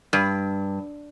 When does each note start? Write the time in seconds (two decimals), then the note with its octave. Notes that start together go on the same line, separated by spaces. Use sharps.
0.13 G2